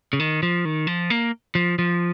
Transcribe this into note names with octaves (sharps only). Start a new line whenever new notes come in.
C#3
D#3
F3
D#3
F3
A#3
F3
F3